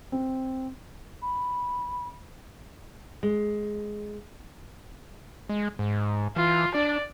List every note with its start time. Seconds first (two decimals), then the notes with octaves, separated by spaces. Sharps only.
0.12 C4
1.22 B5
3.23 G#3
5.49 G#3
5.79 G#2
6.36 E3 F4
6.75 D4 D5